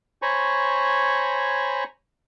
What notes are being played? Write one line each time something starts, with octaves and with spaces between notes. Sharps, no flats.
C5 C#5 G#5 A#5 B5 C#6